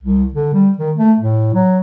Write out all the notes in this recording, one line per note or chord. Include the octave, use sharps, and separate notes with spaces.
C2
D3
G3
D#3
A3
A2
F#3